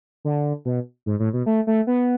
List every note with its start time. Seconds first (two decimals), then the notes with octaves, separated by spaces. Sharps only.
0.25 D3
0.65 B2
1.06 G#2
1.20 A2
1.33 B2
1.46 A3
1.67 A3
1.87 B3